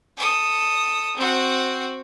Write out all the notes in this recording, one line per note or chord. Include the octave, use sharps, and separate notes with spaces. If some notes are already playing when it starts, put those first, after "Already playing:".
A4 D#6
C4 F#4